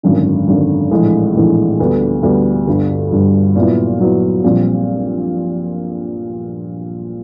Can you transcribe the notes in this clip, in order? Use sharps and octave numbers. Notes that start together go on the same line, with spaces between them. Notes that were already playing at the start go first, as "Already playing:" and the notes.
G#1 F#2 D3
G#1 F#2 D3
A#1 A2 E3 G#3
A#1 A2 E3 G#3
D2 D3 G3 B3
D2 D3 G3 B3
G1 G2 D3
G1 G2 D3
A#2 F#3 B3 E4
A#2 F#3 B3 E4
A#1 A#2 G3 C4